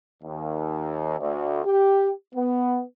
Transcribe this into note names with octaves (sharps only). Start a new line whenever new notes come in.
D#2
D2
G4
B3